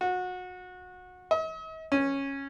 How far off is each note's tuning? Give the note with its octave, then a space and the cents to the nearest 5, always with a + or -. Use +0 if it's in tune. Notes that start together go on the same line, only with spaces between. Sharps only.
F#4 -25
D#5 +45
C#4 -10